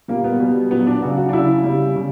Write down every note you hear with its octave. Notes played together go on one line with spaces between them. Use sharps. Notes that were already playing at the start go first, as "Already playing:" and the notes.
A#2 G3 A#3
B3
B2 G3
A#2 F#3 B3
D4
C#3 F#3 F#4
F#4
D4
C#3 F#3 E4
C#3 G3
C#3 G3